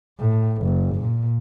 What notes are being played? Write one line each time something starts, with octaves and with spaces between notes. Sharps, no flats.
A2
F#1
A#2